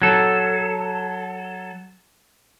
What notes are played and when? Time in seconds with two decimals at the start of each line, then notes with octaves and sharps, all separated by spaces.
0.02 F#3 A4